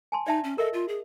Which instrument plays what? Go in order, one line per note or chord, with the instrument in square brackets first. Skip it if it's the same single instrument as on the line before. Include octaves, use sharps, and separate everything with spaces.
[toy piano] G#5 A5 C6
[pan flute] D#4 [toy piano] D5 E5 A5
[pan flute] C#4
[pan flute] A4 [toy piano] A#4 D#5 E5
[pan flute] F4
G#4